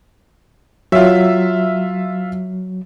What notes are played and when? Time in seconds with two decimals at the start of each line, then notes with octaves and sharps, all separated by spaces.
0.92 F#3 F4 E5